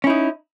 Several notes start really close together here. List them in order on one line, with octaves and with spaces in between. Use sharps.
C#4 E4 D#4